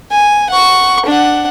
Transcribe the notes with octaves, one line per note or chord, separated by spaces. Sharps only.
G#5
F#5 C#6
D4 F#5